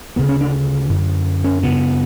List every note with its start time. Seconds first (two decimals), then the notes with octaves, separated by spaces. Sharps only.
0.16 D2 C#3 B3
0.29 C#4
0.41 D4
0.89 F#2 D3
1.44 C#4
1.63 F#2 C#3 B3